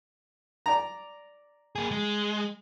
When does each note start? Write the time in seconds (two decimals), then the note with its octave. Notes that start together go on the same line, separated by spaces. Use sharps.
0.66 D5 A#5
1.75 A#3 G#4
1.91 G#3